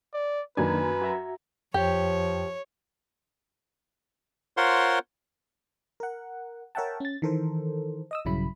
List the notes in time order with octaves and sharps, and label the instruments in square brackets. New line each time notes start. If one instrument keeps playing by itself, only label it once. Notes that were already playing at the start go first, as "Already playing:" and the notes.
[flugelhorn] D5
[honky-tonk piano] F#2 G#5 G#6 [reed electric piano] D#3 A#3 D4 [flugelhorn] B4
[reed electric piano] F#4 E5 A#5
[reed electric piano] F2 G5 [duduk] F3 [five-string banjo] G4 [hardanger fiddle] C#5
[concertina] F4 A#4 C5 C#5 F#5 C6
[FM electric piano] A#4 F#5
A#4 C#5 E5 F#5 G5 A5
C#4 A6
D#3 E3 A4 A#4 C5
D#5 D#6 E6
A#1 G2 C#3 F#3 E4 B5